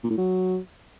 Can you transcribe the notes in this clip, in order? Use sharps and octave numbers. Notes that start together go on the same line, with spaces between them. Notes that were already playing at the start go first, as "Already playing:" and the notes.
A#2
A2
F#3